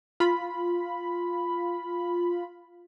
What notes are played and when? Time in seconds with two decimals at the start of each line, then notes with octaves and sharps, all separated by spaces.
0.20 F4 B5